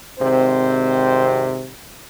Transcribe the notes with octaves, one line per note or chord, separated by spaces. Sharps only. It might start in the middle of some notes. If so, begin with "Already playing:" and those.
G#1 C3 C4 C5